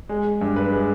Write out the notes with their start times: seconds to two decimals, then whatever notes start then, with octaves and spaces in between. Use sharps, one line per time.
0.09 G#3
0.41 G2
0.56 B4
0.72 G#3